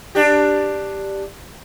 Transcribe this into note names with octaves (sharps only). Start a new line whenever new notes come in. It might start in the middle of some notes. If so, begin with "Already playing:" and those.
D4 G4